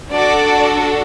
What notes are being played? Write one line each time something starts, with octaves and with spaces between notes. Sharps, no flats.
D4 F#4 A4 D5